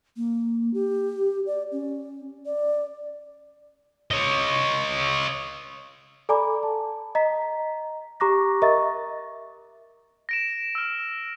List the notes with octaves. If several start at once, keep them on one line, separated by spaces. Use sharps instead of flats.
A#3
G4
D5
C#4
D5
C#5 D#5
A4 D5 G#5 A#5 B5 D6
A5
D#5 A#5 B6
G4 A#5 C#6 D6 F#6 A#6
A#4 D#5 E5 A#5 C#6 A6
A#6 D7 E7
E6 F6